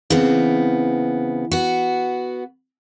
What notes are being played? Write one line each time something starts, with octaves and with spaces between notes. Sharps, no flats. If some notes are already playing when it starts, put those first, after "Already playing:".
C#3 E3 B3 C4
B3 F#4